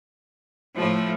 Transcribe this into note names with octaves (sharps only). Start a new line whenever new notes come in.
A2 F3 A3